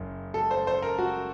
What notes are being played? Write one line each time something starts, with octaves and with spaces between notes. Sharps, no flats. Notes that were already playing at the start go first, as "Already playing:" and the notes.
Already playing: F#1 F#2
A4
C5
C5
A#4
F#4